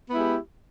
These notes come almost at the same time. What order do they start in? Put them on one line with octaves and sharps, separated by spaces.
B3 E4 G#3 G4